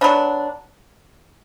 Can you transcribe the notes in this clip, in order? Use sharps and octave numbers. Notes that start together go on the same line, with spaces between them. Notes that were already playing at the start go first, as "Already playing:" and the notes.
F#3 B3 D4